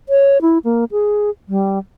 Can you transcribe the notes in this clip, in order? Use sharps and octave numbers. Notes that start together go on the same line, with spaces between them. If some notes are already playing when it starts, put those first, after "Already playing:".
C#5
E4
A#3
G#4
G3